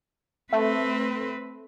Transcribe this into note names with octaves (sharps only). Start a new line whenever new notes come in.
A3 C4 B4